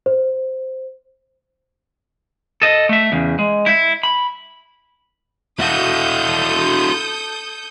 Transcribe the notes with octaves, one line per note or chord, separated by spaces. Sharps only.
C5
A4 D#5
A3 E5
E2 C#3
G#3
E4 E5
B5
E4 F#4 A4 D#6 G6